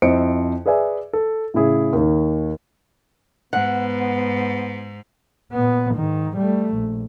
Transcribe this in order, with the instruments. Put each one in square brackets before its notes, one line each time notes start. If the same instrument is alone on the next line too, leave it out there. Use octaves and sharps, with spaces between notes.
[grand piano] F2 E4 C5 D#5 C#7 D7
G#4 B4 D5 E5 G#5
A4
A2 C#3 C#4 E4 G#4
D#2 D#3
[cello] G#2 [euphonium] B3 [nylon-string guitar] F#5
[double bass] A#2 B3
G#2 D#3
G3 A3
A#1